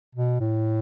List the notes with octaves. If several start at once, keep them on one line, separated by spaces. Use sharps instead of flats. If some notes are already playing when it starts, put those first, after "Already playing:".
B2
A2